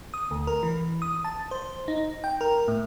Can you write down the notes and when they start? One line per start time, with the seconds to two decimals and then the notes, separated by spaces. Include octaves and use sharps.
0.14 D#6
0.31 D2
0.47 A#4
0.63 E3
1.02 D#6
1.24 A5
1.51 C5
1.88 D#4
2.24 G5
2.41 A#4
2.68 A2